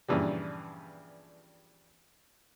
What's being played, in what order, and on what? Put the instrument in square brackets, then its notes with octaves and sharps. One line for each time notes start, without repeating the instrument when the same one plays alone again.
[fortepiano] G2 A#2 C#3 E3 F3 G3